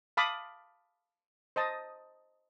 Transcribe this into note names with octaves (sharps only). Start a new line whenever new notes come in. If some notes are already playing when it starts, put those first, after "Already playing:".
F5 A5 B5 D6 D#6
C5 D#5 A5 D#6